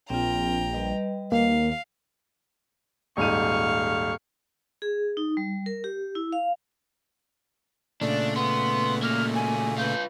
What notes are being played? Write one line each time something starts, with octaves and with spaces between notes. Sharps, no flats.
A#1 C4 F4 G5 A#5
G3 B4 D#5
D#2 A#3 F5
D#1 G#2 F5 C#6 D#7
G#4
D#4
G3
A#4
G4
E4
F5
A#2 C#3 A3 D4
B3 C6
C#2 A#3 F6
G#5
F4 B4 G6